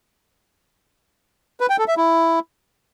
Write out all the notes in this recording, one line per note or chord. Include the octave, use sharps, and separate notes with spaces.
B4
G5
A4
E5
E4